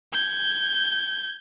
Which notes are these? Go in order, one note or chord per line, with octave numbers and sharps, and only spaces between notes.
G6 G#6